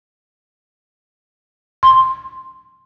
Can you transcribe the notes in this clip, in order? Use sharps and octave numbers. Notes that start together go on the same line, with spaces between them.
C6